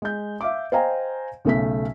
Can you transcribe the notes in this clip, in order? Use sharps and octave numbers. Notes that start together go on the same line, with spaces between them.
G#3 G6
E5 F5 D6
C5 D#5 F5 G5 G#5 A#5
B1 C#3 A3 C#4 B6